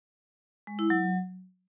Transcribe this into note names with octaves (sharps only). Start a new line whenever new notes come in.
G#3
E4
F#3